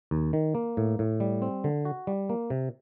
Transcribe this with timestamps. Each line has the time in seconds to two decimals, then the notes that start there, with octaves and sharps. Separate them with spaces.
0.11 D#2
0.33 D#3
0.55 A#3
0.77 A2
0.99 A2
1.20 G3
1.42 C4
1.64 D3
1.85 F#4
2.07 G3
2.29 A#3
2.50 C3